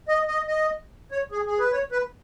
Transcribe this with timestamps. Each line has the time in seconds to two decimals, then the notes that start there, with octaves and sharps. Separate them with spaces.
0.08 D#5
0.28 D#5
0.48 D#5
1.11 C#5
1.32 G#4
1.46 G#4
1.59 B4
1.72 C#5
1.92 B4